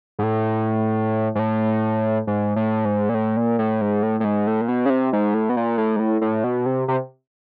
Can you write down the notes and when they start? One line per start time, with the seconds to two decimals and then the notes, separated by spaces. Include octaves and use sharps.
0.19 G#2
0.23 A2
1.35 G#2
1.39 A2
2.27 G#2
2.56 A2
2.85 G#2
3.09 A#2
3.14 A2
3.37 A#2
3.59 A2
3.81 G#2
4.03 A2
4.20 A2
4.24 G#2
4.47 A2
4.61 A#2
4.68 B2
4.86 C#3
4.90 C3
5.13 G#2
5.34 A2
5.49 B2
5.57 A#2
5.78 A2
5.96 G#2
5.99 A2
6.21 A2
6.44 B2
6.66 C3
6.88 C3